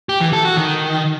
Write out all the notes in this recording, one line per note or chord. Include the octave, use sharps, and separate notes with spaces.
G4
E3
A4
F#4
D#3